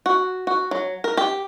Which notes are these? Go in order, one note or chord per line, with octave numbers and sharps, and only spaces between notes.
F#4
F#4
F#3
A#4
G4